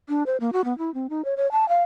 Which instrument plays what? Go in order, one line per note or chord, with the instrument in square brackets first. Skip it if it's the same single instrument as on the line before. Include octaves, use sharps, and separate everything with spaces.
[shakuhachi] D4
C5
A#3
F#4
B3
E4
C4
D#4
C#5
C#5
A5
F5